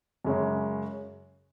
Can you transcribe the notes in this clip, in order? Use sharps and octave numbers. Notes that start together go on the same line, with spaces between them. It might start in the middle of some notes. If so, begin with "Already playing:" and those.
F#2 C#3 G#3 C#4